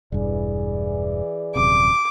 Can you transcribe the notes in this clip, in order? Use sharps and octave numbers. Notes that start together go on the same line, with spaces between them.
E1 G2 E3 G#4 D5
D#1 F#2 C3 D6